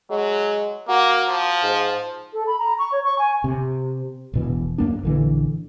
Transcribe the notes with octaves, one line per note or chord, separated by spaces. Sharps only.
F#3 G#3
A#3 F#4
F3
G#2
A4
B5
A#5
C#6
C#5
C#6
G#5
C3
E1 B2 E3
F#2 A#3 D4
A#1 D3 E3